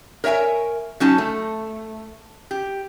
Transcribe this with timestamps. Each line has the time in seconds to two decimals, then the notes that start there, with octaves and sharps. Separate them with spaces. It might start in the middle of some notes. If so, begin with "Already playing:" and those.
0.24 A#4 C#5 E5 G5 G#5
1.00 F#3 C#4 D#4 A5
1.18 A3
2.51 G4